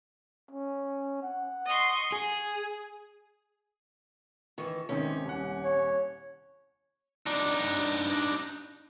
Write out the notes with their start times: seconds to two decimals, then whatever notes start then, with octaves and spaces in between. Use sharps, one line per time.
0.51 C#4
1.23 F#5
1.67 D#5 C6 C#6
2.12 G#4
4.58 D#3 E3 C#6
4.89 G#1 C3 D#3 C#4 G4
5.25 D#1 C2 F#5
5.63 C#5
7.26 D4 D#4